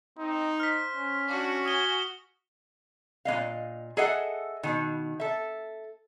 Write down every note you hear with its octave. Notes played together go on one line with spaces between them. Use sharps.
C4 D#4
C5 F6 B6
C#4
D4 F#4
G#5 D#6 G7
A#2 B3 D#5 F5
G#4 A4 D#5 E5 F#5
B2 D#3
A4 E5